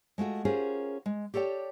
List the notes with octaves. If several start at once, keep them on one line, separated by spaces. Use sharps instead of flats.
G#3 A3 F4 F#4
C#4 F4 G4 G#4 A#4 C5
G#3
G4 A4 C#5 D5 G5